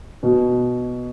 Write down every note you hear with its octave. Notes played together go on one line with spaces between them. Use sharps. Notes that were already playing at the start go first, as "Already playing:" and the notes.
B2